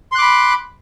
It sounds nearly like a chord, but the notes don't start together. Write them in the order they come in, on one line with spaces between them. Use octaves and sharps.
C6 F#6 D6 B5